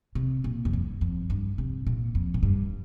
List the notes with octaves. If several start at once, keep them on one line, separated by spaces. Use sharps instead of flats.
C3
A#2
F2
G2
F2
G2
C3
A#2
F2
A#2
G2